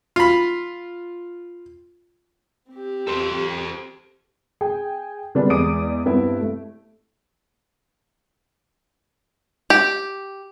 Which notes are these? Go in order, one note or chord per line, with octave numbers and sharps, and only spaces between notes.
F4 B5
C4 G4
A4 C5
G#4 G5
D3 G3 G#3 B3 D4
E2 G#3 D5 D6 D#6 D7
G2 B3 C4 E4
A3
G4